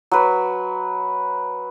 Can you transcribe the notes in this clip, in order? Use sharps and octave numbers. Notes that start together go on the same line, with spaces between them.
F#3 B4